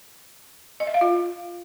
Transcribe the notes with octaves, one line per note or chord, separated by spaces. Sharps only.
D#5
E5
F5
F4